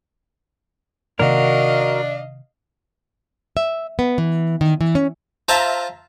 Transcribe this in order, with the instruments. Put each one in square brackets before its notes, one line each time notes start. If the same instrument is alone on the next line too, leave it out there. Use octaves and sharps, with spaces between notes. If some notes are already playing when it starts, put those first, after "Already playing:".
[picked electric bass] C3 D#3 A#3 [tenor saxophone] D4 [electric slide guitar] F#4 A#4 [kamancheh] D#5 F5
[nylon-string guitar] E5
B3
E3
D#3
E3
C#4
[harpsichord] F4 C5 F5 [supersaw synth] E5 A5 A#5